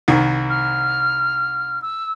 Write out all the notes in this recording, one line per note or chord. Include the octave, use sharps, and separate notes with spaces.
C2 D#3
F6
E6